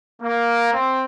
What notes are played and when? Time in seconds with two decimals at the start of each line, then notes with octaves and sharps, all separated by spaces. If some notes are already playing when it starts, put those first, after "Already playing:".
0.22 A#3
0.74 C4